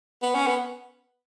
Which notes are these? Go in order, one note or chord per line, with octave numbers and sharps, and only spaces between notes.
B3
C#4
B3